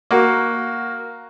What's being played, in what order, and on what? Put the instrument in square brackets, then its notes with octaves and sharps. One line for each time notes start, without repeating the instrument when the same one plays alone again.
[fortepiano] A#3 F#4